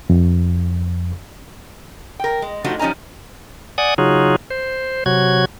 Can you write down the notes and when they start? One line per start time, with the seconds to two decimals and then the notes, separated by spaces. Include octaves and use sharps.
0.10 F2
2.20 A#4 G5
2.42 G#3
2.64 F3 G3 A3 D4 D#4 F#4
2.79 F3 G3 C#4 D#4 G#5 A#5
3.78 D5 F#5 G#5 D#6
3.98 C#3 F#3 D#4 F4 F#4 G#4
4.50 C5
5.06 C3 F#3 F#4 G#6